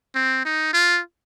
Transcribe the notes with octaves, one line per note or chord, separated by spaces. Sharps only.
C4
D#4
F4